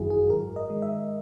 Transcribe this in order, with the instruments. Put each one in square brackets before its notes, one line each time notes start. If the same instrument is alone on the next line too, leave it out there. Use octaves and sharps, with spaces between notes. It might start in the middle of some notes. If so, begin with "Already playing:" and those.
Already playing: [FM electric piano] G#1 F#2 D#3 F#3 E4 F#4 G#4
G#4
G#2 A#4
D#5
D#3 G#3
E5